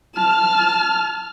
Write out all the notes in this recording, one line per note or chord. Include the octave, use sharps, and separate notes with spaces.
A5 F6